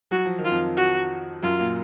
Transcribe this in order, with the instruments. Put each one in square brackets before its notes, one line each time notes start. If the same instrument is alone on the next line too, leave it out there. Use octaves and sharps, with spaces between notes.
[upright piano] F#3 [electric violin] F#4
[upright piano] F3
D#3
[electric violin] F4
[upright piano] F2 F3
[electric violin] F#4
[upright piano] F#2 F#3 [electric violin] F4
[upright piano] A#2 A#3